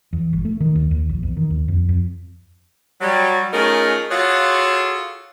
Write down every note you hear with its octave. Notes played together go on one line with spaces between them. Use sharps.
E2
G1
A3
D#3
D#2
D#2
A#1
E2
D#3
D#2
F2
F2
F#3 G3
A3 C#4 D#4 F4 G#4 A#4
F4 F#4 G#4 A4 C#5 F5